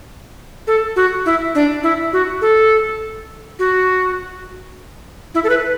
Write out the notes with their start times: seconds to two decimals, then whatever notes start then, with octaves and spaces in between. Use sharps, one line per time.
0.67 A4
0.96 F#4
1.26 E4
1.55 D4
1.83 E4
2.13 F#4
2.42 A4
3.59 F#4
5.35 E4
5.44 A4
5.49 B4